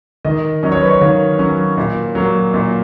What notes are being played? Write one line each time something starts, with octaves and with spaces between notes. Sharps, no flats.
D#3 D#5
F#3 C#4 D#5
C#5
B4
C#5
D#3 F5
F#3 C#4
A#2
F#3 A#3
A#2